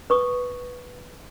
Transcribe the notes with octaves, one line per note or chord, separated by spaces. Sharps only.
B4 C#6 D#6